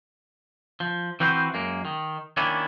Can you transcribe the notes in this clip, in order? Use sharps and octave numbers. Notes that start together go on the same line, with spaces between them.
F3
E3 C4 F#4 B4 C5
F#2 G#3 A#3
D#3
D#3 A#3 C#4 D4 E4